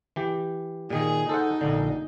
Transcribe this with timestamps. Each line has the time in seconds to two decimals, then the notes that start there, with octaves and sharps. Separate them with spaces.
0.16 E3 G4
0.90 A#2 D#3 G#4
1.29 D#4 A4 C5 F#5
1.61 A#1 A#2 D3